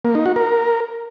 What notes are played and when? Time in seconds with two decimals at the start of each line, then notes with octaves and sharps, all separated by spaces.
0.05 A#3
0.15 D#4
0.26 F#4
0.36 A#4